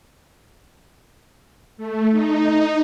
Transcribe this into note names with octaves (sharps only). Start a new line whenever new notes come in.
A3
D#4